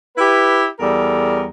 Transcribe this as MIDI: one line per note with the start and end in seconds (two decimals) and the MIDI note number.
0.17 0.65 64
0.17 0.65 67
0.17 0.65 71
0.79 1.47 40
0.79 1.47 55
0.79 1.47 69
0.79 1.47 70